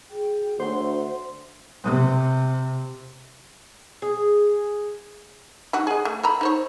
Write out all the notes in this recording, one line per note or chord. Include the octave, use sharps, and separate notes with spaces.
F#4 G#4 G5
D2 A4 C5 C#5 F#5 C6
C3
G#4
G3 D#4 F#4
G#4 D#5
A3
A4 A#5 B5
D#4 C5 C#5